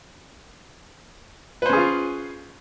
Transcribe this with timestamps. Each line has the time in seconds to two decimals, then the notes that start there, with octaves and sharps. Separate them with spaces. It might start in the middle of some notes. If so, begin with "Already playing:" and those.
1.62 B4
1.66 C5
1.69 C#4
1.73 G#4
1.76 F4